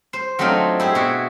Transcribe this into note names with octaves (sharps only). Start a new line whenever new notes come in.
C5
F#3 A3 C4 D4 D#4 F4
E4 G4 G#4
B2 F#4 E5